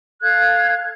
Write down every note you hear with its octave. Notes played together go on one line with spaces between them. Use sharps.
A4 F5 F#6 G#6